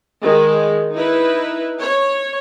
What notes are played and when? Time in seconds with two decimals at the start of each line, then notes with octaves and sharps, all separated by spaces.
0.23 D#3 G#3
0.93 D#4 E4 B4
1.80 C#5